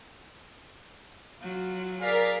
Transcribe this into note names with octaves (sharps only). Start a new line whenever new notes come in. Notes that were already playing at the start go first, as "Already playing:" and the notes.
F#3 F4
G#4 A#4 D5 F5 B6